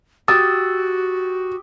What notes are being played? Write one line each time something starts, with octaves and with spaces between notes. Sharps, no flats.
F#4 G4 D#6 E6 A6